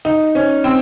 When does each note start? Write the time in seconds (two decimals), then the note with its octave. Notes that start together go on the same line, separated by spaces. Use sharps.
0.05 D#4
0.35 C#4
0.64 C4